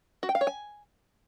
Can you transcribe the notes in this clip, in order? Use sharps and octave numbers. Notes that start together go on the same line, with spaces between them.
F#4
G5
F5
C#5
G#5